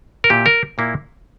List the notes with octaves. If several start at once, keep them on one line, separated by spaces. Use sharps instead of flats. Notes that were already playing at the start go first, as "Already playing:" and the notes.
A#4
A#2 A#3 E4 G4
A#4
A#2 A#3 E4